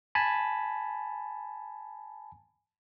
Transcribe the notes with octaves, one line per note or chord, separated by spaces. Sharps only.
G#5 A5 B5